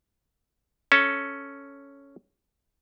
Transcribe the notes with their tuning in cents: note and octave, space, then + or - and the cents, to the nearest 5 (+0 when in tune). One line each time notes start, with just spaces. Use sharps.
C#4 +0 A4 +0